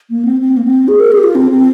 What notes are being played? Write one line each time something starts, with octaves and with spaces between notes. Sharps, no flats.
A#3
C4
C4
A#3
C4
G#4
A#4
G#4
G4
F4
C4
C4